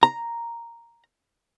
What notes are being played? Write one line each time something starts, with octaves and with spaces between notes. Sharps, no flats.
A#5